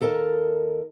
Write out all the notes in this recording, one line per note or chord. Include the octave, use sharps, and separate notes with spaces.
D#2 A4 A#4 D#5 A5